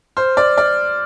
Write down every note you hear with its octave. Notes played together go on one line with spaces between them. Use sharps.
C5 F6
D5 F6
D5 F6